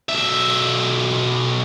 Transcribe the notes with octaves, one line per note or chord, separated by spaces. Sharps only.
B1 E5